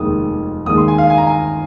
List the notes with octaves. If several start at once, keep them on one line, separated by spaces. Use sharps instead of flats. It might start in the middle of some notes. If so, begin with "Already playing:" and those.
Already playing: F1 D#2 D#3 G#3 D#6
D#2 D#3 G#3 D#6
C6
G#5
F5
G#5
A#5
G#5